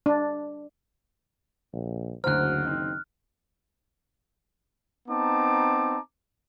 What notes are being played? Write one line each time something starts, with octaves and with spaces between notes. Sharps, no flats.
D4
A#1
F#1 D2 F#4 C5 A#5 F6 F#6
D#3 C4 D#4
B3 C4 D#4 A5 A#5 D6